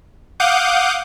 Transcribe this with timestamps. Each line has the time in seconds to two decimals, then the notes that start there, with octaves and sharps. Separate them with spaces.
0.40 F5 F#5 D6 D#6 G6